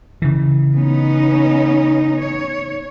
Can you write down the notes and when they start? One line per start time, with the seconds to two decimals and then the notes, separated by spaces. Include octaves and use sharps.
0.22 C#3 E3
0.75 B3 C#4 D#4
2.20 C#5